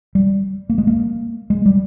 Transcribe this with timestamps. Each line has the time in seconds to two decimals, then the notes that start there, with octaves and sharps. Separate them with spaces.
0.15 G3
0.70 A#3
0.78 G#3
0.87 A#3
1.50 G#3
1.66 G3